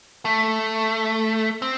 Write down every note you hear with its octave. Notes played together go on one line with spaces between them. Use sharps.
A3
C4